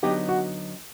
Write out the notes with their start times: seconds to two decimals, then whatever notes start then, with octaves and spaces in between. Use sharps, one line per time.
0.03 D3 F#3 B3 D#4 G4
0.28 F#4